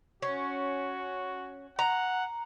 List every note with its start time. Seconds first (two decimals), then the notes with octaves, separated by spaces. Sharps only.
0.22 C#4 F#4
1.79 F#5 A#5